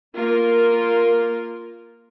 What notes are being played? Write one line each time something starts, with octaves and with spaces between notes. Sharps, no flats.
A#3 F4 A#4